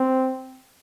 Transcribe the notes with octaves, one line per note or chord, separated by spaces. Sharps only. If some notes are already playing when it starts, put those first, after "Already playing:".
Already playing: C4